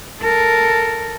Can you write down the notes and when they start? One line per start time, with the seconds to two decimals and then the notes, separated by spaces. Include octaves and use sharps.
0.22 A4 A#4